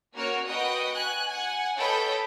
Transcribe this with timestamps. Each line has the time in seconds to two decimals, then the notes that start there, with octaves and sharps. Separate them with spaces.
0.15 A#3 C#4 F#4 A#4 C#5 F6
0.47 F#4 B4 D#5 F#5 G5 D#6
0.95 G#5 F#6
1.28 F#5 G#5
1.77 A4 B4 C#5 D#5 G5 B5